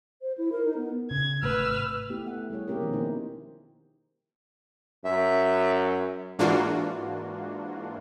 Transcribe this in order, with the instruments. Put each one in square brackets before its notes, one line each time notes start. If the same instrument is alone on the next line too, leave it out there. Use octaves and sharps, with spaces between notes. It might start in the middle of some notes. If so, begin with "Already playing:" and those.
[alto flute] C5
E4
A#4
D#4
B3
[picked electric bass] C#3 [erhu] G#6
[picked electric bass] G#1 C3 A3 [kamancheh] B4 F6 [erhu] E6
[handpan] A3 B3 E4 G4
F#5
G3 E4 G#4 C#5
A#3 C4 C#4 G4 G#4 A#4
B2 D#3 F3 A#3 B3 F#4
D#4 E4 C5
[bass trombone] F#2 [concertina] E5
[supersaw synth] G#2 E3 A#3 D4 F4 F#4